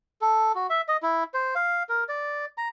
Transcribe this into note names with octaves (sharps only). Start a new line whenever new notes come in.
A4
F#4
E5
D#5
E4
C5
F5
A#4
D5
A#5